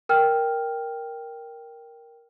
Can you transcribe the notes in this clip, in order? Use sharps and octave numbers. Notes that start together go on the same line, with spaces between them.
A#4 G5 F6